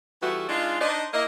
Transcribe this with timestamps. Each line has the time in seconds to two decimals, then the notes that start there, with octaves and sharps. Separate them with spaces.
0.22 E3 G3 A3 B3 F4 F#4
0.49 G#3 D4 D#4 F4
0.81 D4 D#4 C5 D5 D#5
1.14 A#3 E4 D#5